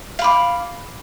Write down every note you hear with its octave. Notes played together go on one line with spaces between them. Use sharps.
F5 B5 D6